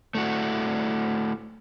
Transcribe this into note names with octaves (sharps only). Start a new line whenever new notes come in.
A3 E4 F#4